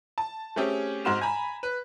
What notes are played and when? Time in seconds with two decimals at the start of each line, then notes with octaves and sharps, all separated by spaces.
0.18 A5
0.56 A3 C4 C#4 G4 G#4
1.05 G#2 C4 F#4 C6 F6 E7
1.21 G#5 A#5 B5
1.63 B4